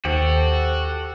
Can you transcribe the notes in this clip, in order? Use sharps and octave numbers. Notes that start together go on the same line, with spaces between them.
D#2 F#4 G4 A4 C5 G5